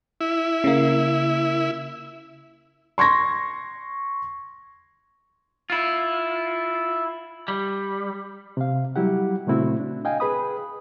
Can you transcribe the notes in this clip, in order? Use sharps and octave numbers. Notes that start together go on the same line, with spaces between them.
E4
C#3 A#3
C6 C#6 G#6 A#6
E4 F4
G3
C3 F5
F#3 G3 E4 G4 F#5
A#2 C#3 A3 C4 E4 F#4
D4
D#5 F5 G5 G#5
G#4 B4 B5 D#6